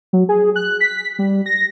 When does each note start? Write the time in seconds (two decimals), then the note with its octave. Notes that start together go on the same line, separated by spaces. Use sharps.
0.13 F#3
0.29 G#4
0.56 F#6
0.81 B6
1.19 G3
1.46 A#6